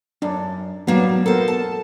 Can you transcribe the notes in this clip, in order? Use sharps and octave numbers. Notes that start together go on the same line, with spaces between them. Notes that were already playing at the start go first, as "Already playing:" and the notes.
F#2 D4
F#3 G3 A#3 B3 D4
B3 A4 A#4 C5
A5